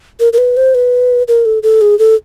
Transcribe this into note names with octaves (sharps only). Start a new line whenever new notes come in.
A#4
A#4
B4
C5
B4
A#4
A4
A4
G#4
A4